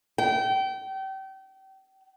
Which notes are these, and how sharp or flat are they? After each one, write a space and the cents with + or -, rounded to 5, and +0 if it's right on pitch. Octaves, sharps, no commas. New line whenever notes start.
G5 -30